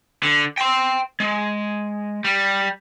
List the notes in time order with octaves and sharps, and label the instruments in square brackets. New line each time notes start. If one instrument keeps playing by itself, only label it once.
[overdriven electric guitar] D3
G5 C6
G#3
G3